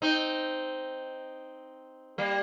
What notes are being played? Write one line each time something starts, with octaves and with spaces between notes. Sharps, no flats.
C4 D#4
G3 A#3